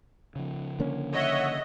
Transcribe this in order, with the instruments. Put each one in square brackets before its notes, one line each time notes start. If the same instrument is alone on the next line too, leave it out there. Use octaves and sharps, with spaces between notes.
[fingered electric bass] C#3 F3
[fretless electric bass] D3 A#3 C#4
[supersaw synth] C#5 E5 F#5 [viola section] D#5